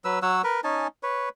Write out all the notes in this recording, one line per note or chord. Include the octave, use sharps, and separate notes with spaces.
F#3 B4 E6
F#3 C#5 F#5 E6
A#4 B4
C#4 D#4 G#5 A5
B4 C#5